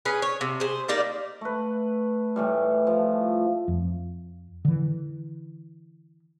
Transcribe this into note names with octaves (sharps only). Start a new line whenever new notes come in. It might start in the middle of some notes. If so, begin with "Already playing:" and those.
C#4 G#4 B4
C#5
C3
G#4 C5
G3 A#3 D#4 D5
A3 B4
A2 E3 G3
F3
F2
D3 E3